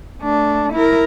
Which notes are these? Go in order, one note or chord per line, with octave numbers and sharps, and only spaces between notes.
A3 D4
E4 A#4